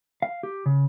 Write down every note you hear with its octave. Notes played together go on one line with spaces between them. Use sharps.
F5
G4
C#3